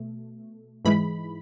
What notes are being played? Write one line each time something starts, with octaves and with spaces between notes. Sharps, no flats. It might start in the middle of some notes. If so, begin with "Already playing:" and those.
Already playing: B2 A3
G#2 E3 G#3 B5